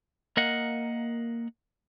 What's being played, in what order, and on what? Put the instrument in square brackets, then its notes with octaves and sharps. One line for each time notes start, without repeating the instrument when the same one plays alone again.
[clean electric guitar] A#3 A#4 D#5 F5 F#5